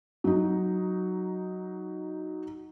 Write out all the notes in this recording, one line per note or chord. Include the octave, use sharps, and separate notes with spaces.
F#3 D#4